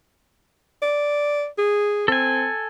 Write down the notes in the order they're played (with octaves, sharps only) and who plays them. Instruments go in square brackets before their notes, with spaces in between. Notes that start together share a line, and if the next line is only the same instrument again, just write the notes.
[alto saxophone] D5
G#4
[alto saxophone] C4 [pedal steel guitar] A4 G#5